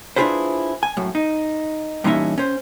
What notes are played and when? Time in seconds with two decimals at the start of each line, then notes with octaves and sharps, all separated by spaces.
0.16 D4 E4 F4 G#4 B4 C5
0.83 G#5
0.97 F#2 A2
1.15 D#4
2.04 G2 A#2 E3 C#4 D#4 E5
2.38 C#4 C5